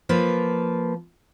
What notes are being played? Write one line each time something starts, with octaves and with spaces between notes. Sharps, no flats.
F3 A#3 B4